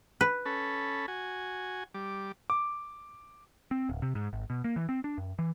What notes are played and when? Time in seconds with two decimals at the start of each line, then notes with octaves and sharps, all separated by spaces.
0.21 B4
0.45 C#4 A4 B5
1.08 F#4 G#5
1.94 G3 D6
2.50 D6
3.71 C4
3.89 D1
4.02 C3
4.15 G#2
4.33 G#1
4.50 B2
4.64 A#3
4.76 E3
4.89 C4
5.04 D4
5.18 F#2
5.39 E3